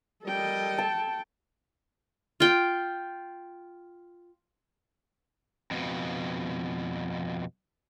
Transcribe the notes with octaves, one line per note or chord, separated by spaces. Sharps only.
G3 A4 A#4 D#5 G5
A5
F4 G5
F2 B2